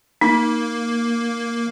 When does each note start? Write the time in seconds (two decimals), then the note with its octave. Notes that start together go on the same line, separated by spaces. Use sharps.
0.21 A#3 D#4